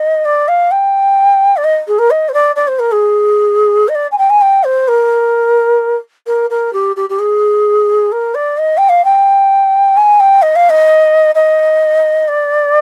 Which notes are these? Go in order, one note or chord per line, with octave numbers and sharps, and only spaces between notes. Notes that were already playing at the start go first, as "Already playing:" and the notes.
Already playing: D#5
D5
F5
G5
D5
D#5
G#4
A#4
D#5
C5
D5
D5
C5
A#4
G#4
D#5
D5
G#5
G5
G#5
G5
C5
A#4
A#4
A#4
G4
G4
G4
G#4
A#4
D5
D#5
G5
F5
G5
G#5
G5
D#5
F5
D#5
D#5
D5